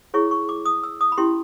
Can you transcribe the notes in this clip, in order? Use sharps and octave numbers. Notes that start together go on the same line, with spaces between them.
E4 G#4 C#5 C#6
C#6
D6
D#6
E6
D#6
B5
C#4 E4 G4 C6